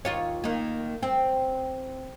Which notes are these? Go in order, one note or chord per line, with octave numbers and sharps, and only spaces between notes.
D#2 F4 C#5
D#3 A#3
C4